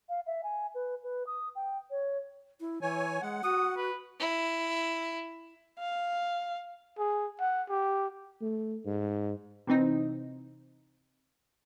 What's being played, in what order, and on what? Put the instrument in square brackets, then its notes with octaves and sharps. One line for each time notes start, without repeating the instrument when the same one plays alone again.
[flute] F5
E5
G#5
B4
B4
D#6
G5
C#5
[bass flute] E4
[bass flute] E3 [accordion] C#5 G#5
[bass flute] G#3 [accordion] F#5
[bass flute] F#4 [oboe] D#6
[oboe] B4
[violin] E4
[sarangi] F5
[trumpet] G#4
F#5
G4
[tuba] A3
G#2
[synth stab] C3 E3 C4 D#4